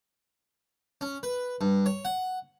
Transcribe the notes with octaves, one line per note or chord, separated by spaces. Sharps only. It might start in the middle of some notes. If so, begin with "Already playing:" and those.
C#4
B4
G2
C#5
F#5